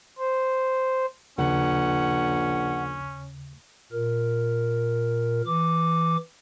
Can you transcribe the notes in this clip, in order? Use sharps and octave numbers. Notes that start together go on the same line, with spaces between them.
C5
A#1 D#2 C#3 C#4 F#5
A#2 A#4
E3 D6